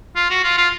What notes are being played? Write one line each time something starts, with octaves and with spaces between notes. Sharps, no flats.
F4
F#4
F4
F4